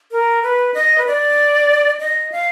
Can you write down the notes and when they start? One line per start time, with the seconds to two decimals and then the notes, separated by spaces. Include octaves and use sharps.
0.12 A#4
0.43 B4
0.74 D#5
0.98 B4
1.07 D5
2.00 D#5
2.32 F5